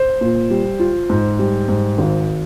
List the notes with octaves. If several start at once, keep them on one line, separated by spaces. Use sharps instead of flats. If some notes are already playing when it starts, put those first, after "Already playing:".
Already playing: C5
A#2
G3
F4
G#2
G3
G#2
G#1